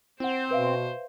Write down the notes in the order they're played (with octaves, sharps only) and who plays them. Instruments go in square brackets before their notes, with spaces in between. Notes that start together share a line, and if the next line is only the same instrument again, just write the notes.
[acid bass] C4 [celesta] E4 F#5 [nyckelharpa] C5
[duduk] B2 [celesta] B4 E5 F5